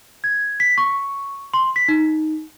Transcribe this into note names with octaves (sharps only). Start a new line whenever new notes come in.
G#6
B6
C#6
C6
B6
D#4